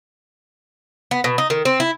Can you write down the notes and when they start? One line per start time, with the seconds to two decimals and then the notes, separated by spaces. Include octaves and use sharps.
1.11 B3
1.24 B2
1.38 D#4
1.50 D#3
1.65 C4
1.80 E4